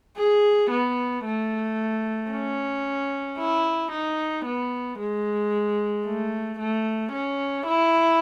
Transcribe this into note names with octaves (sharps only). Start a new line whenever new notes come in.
G#4
B3
A3
C#4
E4
D#4
B3
G#3
A3
A3
C#4
E4